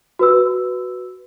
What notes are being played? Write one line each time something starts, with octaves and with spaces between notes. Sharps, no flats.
F#4 B4 E6